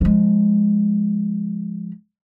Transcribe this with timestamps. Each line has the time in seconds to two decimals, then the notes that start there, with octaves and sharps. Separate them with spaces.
0.01 F3 G#3